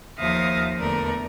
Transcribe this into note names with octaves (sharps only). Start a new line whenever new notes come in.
D#2 F3 E5 F5 D#6 A#6
E2 D3 A3 A#4 D5